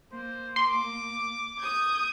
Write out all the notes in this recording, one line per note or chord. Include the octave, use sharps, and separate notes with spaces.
A#3 C5
C6 D6
D#6 G6 G#6